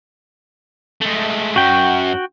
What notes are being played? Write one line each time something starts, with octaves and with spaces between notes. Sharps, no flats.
G#3 A3
F#2 F#4 G5